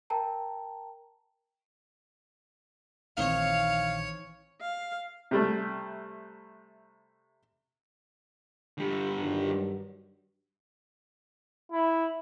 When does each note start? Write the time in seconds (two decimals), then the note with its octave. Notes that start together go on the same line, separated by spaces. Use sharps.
0.10 A#4 G5 A5 A#5
3.17 A#1 D#3 E3 C4 D#4 C#5 F5
4.61 F5
5.31 C3 G3 A3
8.78 D3 G3
9.18 G2 D#3 F#3
11.72 E4